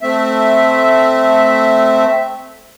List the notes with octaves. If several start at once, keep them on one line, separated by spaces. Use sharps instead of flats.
A3 C4 E5